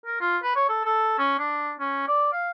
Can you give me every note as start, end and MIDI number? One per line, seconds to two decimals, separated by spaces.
0.06 0.18 70
0.20 0.38 65
0.43 0.55 71
0.56 0.65 73
0.69 0.84 69
0.85 1.14 69
1.19 1.37 61
1.39 1.72 62
1.80 2.07 61
2.08 2.30 74
2.33 2.50 77